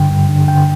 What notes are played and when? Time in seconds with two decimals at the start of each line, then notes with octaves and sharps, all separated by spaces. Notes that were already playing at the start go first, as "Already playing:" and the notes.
Already playing: G2 D3 G5
0.11 G2
0.29 D3
0.47 D3 G5